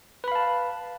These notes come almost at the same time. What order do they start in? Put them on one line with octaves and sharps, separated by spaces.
B4 B5 F5 A5